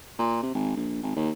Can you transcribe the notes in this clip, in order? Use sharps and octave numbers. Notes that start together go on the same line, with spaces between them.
A#2
C3
G#1
A#1
G#1
D#2